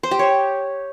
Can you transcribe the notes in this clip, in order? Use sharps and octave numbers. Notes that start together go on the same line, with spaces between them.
C5
G4
C#5